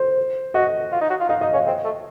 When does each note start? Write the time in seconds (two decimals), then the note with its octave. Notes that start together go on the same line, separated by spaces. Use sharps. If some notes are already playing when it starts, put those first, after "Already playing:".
Already playing: C5
0.54 F#4 D#5
0.92 F4
1.01 D#4
1.10 F#4
1.20 F4
1.29 D#4 F5
1.41 D#4 D#5
1.53 C#4 F5
1.67 C4 D#5
1.84 A3